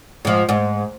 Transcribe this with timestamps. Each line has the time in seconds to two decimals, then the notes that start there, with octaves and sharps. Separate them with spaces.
0.25 G#2 F3
0.49 G#2